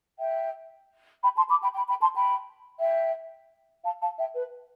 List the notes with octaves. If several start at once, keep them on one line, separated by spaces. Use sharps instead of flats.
E5 G5
G5 B5
A5 C6
B5 D6
G5 B5
G5 B5
G5 B5
A5 C6
G5 B5
E5 G5
F5 A5
F5 A5
E5 G5
B4